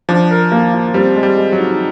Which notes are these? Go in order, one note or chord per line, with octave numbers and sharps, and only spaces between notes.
F3 D4
A#4
A#3
F4
G3 C4
G#3
G3
G#3
F#3
D#4